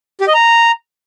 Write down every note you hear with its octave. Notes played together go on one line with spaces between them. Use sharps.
G4
D#5
A#5